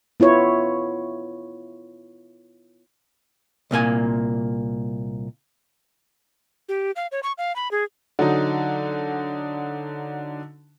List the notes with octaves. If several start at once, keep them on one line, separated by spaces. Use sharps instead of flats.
B3 E4 F4 C#5
C2 A#2 A#3 G#5
G4
F5
C#5
C#6
F5
B5
G#4
D3 F#3 D#4